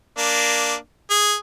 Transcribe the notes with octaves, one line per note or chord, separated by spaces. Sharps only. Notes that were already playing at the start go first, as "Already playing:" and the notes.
A#3 D4
G#4